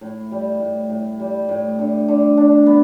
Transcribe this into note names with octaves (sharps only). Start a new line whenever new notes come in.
A2
G3
A2
A2
G3
A2
D3
D3
D4
B3